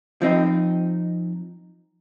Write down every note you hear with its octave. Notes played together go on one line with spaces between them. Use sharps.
F3 C4 D#4